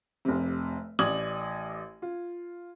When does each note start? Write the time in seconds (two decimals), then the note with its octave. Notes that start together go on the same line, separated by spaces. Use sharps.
0.25 F1 C3
0.99 A1 D5 D#6 G#6 F#7
2.02 F4